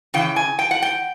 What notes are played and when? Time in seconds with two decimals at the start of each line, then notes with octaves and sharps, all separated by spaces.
0.14 C#3 E3 G5
0.36 G#5
0.59 G5
0.71 F#5
0.82 G5